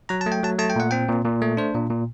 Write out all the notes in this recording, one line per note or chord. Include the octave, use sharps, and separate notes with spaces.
F#3 A#5
A5
A3
G5
F#3 A5
A3 A5
G5
A#2 F#5
C4 G5
A#2
A#2
A3
D4 C5
A#2
A#2